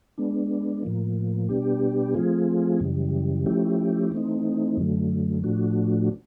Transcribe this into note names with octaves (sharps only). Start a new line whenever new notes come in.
G#3 B3 D4
A2 F3 A#3
B2 G3 B3 D4 G4
F3 A3 C4 F4 G#4
F#2 C#3 E3 G3
F3 A3 C#4 E4 G4
E3 A3 C4 D#4
F#2 D3 F#3 A3
A2 F3 A3 D4 F#4